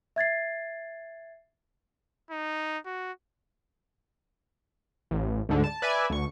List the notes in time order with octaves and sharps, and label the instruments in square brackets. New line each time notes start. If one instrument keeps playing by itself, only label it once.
[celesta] E5 G#6 A6 C7
[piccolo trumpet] D#4
F#4
[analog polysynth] A1
D2 G#2 D3
A5
B4 D5 E5 G#5
D2 C#6